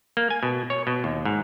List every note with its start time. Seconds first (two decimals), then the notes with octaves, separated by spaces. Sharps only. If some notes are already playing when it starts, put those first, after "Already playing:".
0.17 A#3
0.30 G#5
0.43 B2
0.70 C#5
0.87 B2
1.04 D#2
1.25 G#2